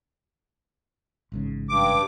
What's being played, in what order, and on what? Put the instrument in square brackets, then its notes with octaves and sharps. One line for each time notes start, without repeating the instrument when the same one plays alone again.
[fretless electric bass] A1 G#2 C#3
[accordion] G2 D6